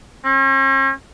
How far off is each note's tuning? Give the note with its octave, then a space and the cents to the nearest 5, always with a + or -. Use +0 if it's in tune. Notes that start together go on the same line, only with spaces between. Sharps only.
C#4 -45